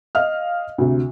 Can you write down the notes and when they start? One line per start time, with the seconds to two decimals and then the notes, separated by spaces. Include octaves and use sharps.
0.15 D#5 F5 F6
0.78 D2 C3